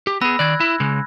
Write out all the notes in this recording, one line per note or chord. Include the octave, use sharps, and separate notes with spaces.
G4
B3 G#4 B5 E6 A#6
D#3 D5 F#6 G#6
E4
C#3 G#3